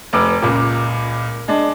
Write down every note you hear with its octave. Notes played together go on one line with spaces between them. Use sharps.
F1 B4 D6
C#2 A#2
G#3 D4